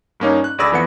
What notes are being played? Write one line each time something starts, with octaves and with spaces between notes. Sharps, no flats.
G2 A#3 C#4 D#4
F#6
D2 G#4 D5 B5 E6 A#6
F2 E3 B3 F#5 C#7